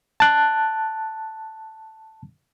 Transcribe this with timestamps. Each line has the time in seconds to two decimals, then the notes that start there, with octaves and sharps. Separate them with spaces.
0.20 A5 F#6